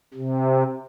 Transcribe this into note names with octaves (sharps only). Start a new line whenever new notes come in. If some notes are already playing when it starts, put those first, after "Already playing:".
C3